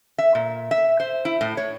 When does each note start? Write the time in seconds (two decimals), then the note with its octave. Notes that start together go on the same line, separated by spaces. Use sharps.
0.18 E5
0.35 A#2
0.71 E5
1.00 C5
1.25 E4
1.41 A2
1.57 C#5